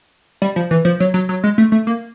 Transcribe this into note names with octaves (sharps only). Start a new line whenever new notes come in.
G3
F3
E3
F3
F#3
F#3
F#3
G#3
A3
A3
A#3